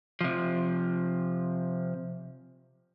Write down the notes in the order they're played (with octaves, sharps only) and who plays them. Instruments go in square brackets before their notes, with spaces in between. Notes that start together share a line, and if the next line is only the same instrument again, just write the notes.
[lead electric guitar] C3 F3